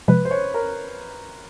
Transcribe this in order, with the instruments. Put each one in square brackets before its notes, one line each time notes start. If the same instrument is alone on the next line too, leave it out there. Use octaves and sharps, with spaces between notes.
[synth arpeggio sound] C3 F3 G#3 [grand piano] B4
[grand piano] C5
C#5
A#4